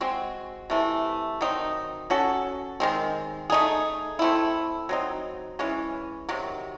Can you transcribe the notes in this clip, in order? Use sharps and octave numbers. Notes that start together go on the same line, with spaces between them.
G#3 C4 F#4
C3 E3 A3
D#3 F#3 C4 D#4
F#3 C#4 F#4 A4
D#3 G#3 C4
A3 D#4 G#4
A3 C4 E4
F#3 C4 D#4
E3 G#3 C#4
C3 D#3 F#3